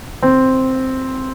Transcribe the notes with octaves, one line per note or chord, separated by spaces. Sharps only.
C4